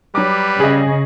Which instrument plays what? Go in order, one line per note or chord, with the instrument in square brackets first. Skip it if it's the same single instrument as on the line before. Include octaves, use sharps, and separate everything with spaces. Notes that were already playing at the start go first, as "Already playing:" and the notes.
[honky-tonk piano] F#3 D6 [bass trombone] G3 [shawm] B4
[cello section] C#3 [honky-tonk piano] G#4 D#5